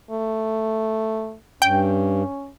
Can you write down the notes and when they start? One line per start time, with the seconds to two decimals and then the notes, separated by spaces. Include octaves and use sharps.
0.11 A3
1.62 G2 C#4 G5